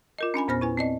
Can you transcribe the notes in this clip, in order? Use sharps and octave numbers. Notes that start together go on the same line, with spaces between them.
F4 A#4 D#5
C#4 D4 G#5 B5
E2 A#2 B3 C5 F6 A#6
E4 B4 G#5
C4 D5 D#5